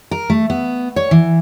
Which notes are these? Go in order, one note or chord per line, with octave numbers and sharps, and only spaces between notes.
A#4
A3
B3
C#5
E3